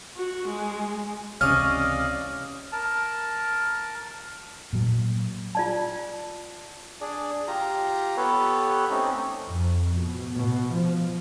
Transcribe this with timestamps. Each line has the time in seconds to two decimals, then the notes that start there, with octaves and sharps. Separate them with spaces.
0.16 F#4
0.48 G#3
1.41 C#2 C3 E3 C#4 D5 D#5 F5 F6
2.72 A#4 A5
4.73 A#2 F#3
5.55 F4 D5 A5
7.01 D4 G#4 D5
7.48 F4 G4 A#5
8.17 B3 G4 A4 B4 C#5
8.90 A3 C4 C#4 D#4
9.45 F2
9.97 B2
10.36 B2
10.73 F3